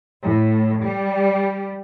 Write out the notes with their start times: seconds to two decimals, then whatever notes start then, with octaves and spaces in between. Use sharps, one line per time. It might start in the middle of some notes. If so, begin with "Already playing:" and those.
0.22 A2
0.82 G3